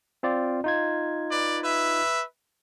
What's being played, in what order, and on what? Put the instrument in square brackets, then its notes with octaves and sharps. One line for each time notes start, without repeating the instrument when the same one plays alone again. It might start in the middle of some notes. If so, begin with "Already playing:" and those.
[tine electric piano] C4 F4 D5
D#4 F4 G#6
[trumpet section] B4 D5
B4 E5